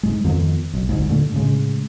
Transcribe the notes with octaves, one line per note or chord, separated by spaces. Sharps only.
G#2 G#3
F2 D#3 F3 B3
B1
G1 D2 G#2
G2 A#2 D3 A3
A2 C#3 G#3